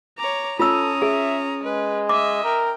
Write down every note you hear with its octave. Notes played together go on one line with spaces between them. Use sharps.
C#5 A#5 D6
C#4 F4 A4 A#5 D#6 E6
G#4 E5
G#3 B4
D#5 E5 D6
A#4 G5